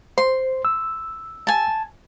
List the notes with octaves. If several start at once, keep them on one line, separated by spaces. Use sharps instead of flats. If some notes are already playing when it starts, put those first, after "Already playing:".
C5 C6
E6
G#5 A5